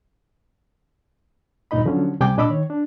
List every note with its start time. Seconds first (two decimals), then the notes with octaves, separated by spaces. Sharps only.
1.71 D2 G2 A#2 D#4 D#5 B5
1.86 D3 F3 F#3 C#4
2.20 C#2 C3 G3 G5 G#5 D6
2.37 A#2 D4 D#5 B5 D6 E6
2.49 D#3 C#5
2.70 D4